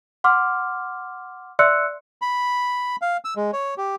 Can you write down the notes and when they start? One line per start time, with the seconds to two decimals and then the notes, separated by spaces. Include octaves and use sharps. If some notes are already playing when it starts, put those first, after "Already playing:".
0.24 F#5 C6 D6 F6
1.59 D5 E5 C6 E6 F#6 C#7
2.22 B5
3.02 F5
3.25 E6
3.36 G#3
3.53 C#5
3.78 G4